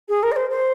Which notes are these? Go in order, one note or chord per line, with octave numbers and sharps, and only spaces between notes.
G#4
A#4
D#5
C5
C5